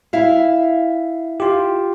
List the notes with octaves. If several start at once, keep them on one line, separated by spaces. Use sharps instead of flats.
E4 E5 F5
F4 G4